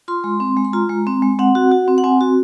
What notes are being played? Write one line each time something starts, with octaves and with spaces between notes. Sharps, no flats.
F4 C6
G#3
C4
G#3
C6
F4 A#5
G#3
C4
G#3
C4 F#5
F#4
F#4
C4
F#5
C4 G#5
F#4